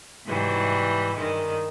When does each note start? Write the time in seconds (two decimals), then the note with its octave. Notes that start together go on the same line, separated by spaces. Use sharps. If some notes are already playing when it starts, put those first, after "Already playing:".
0.25 G#2 C3 E3 F#3 G3
1.15 G2 D#3 G#3